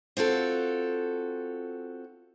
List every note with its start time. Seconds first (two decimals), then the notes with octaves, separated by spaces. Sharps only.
0.17 C4 F4 F#4 A4